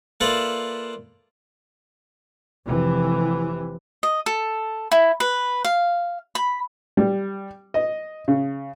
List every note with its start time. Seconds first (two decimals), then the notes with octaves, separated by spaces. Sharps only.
0.21 A#3 F4 A4 B4 D5 E5
2.68 F1 C3 E3
4.03 D#5
4.26 A4
4.91 E4
5.20 B4
5.65 F5
6.35 B5
6.97 G3
7.74 D#5
8.28 C#3